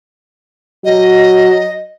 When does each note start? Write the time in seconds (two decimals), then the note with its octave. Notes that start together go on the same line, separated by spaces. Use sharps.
0.85 F#3 D#5